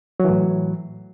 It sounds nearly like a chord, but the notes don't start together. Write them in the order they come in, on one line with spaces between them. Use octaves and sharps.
F#3 E3 A2